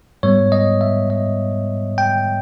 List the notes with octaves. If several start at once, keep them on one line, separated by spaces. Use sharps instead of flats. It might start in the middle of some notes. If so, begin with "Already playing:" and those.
G#2 G3 B3 C#5
D#5
E5
D#5
G5